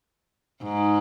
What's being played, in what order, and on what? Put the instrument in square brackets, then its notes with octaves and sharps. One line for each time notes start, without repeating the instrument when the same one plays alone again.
[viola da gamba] G#2